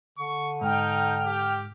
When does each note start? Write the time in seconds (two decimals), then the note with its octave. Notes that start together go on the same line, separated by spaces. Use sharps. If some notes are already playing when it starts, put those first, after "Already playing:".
0.18 D3 C#6
0.61 G#2 D#4 G5 F6
1.26 G4